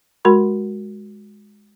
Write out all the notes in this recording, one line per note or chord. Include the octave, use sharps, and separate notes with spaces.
G#3 F#4 A#4 B5 C6